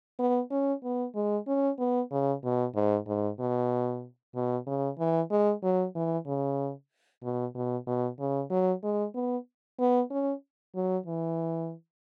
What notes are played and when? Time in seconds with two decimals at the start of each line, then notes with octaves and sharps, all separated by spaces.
0.19 B3
0.51 C#4
0.83 B3
1.15 G#3
1.47 C#4
1.79 B3
2.11 C#3
2.43 B2
2.75 G#2
3.07 G#2
3.39 B2
4.35 B2
4.67 C#3
4.99 E3
5.31 G#3
5.63 F#3
5.95 E3
6.27 C#3
7.23 B2
7.55 B2
7.87 B2
8.19 C#3
8.50 F#3
8.83 G#3
9.15 B3
9.80 B3
10.11 C#4
10.75 F#3
11.06 E3